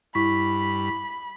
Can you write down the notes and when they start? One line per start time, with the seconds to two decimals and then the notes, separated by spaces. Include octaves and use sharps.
0.15 G2 E4 B5 C#6 B6